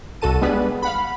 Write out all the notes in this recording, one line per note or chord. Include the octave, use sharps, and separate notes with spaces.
C2 F#4 A4 A5 D#7
G3 G#3 B3 D4 G#4 B4
F5 F#5 B5